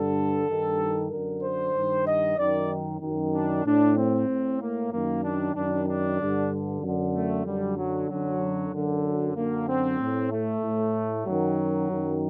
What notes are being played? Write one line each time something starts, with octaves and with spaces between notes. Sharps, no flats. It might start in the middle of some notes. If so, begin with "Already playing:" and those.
Already playing: G2 D3 A4
G2 D#3
F#2 D3 A#4
C5
G2 D#3
D#5
F#2 D#3 D5
F#2 D#3
D4
A2 D4
C4
A2
A#3
F#2 D#3 A#3
D4
F#2 D#3 D4
D4
G2 D3
F#2 D3
A3
F#2 D3 G3
F#3
F#2 D3 F#3
F#2 D3
F#2 D3 A#3
C4
A2
A3
A2
F#2 D#3 F#3
F#2 D#3